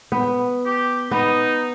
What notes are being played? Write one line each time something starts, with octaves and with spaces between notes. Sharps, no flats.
B3
G4
B3 D#4